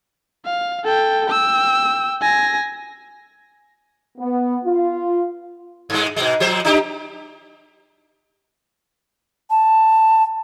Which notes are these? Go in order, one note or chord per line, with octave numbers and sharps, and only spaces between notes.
F5
A4 G5
G5 E6
G#5 A#6
B3
F4
G2 G#3
G#2 B2 G#3
F3 G#3 C5
D4 D#4 G4
A5